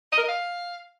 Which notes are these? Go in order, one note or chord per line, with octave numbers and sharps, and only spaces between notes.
D#5
A#4
D#5
F5